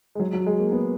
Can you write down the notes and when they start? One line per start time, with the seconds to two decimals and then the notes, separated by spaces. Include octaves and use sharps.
0.15 G#3
0.20 F#3
0.33 F#3
0.46 G#3
0.59 A#3
0.72 B3